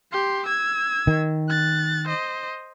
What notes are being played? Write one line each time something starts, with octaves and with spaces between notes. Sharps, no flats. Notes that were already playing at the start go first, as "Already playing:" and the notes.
G4 C6
E6 G#6
D#3
F#6 A6
C5 D#5